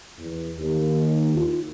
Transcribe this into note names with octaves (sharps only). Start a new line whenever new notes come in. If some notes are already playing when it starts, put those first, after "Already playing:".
E2
D#2
F4